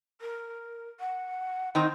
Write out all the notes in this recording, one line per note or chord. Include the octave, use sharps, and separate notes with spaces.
A#4
F#5
D#3 C4 D#4 C6